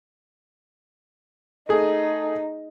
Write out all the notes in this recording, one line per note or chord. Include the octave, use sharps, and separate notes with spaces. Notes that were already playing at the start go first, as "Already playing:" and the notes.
A3 D#4 G#4